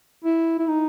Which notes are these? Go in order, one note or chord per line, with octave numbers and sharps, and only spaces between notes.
E4
E4
D#4